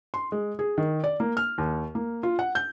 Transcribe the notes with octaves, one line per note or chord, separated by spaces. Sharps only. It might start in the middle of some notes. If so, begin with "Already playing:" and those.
C6
G#3
G#4
D#3
D5
A#3
F6
D#2
A#3
F4
F#5
G6